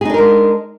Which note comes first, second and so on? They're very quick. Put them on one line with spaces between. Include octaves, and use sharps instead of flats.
G#4 D#4 D4 A#4 G#3